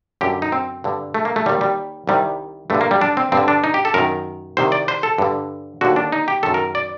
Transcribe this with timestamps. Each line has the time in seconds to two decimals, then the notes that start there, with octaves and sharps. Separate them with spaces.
0.21 F#2 D3 G4
0.42 D#4
0.52 C4
0.84 G2 D3
1.14 A3
1.25 A#3
1.36 A3
1.46 D#2 D#3 G3
1.61 G3
2.07 C2 C3 D#3 G3
2.70 G2 D3 A3
2.81 A#3
2.91 G3
3.01 D4
3.17 C4
3.32 G2 C4
3.37 D3
3.48 D4
3.64 D#4
3.74 G4
3.85 A4
3.94 F#2 D#3 A#4
4.57 C2 C3 D#3 C5
4.72 D5
4.88 C5
5.03 A4
5.18 G2 D3
5.81 D#2 D3 F#4
5.96 D4
6.12 D#4
6.28 G4
6.43 F#2 D#3 A4
6.54 A#4
6.75 D5